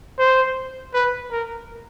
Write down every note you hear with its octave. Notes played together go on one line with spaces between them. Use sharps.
C5
B4
A#4